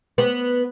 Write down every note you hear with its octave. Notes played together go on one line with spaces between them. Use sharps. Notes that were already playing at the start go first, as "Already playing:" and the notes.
B3